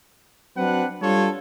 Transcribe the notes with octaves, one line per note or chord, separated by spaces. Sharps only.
F#3 C4 D4 B4 F#5
G3 D4 F4 A4 C#5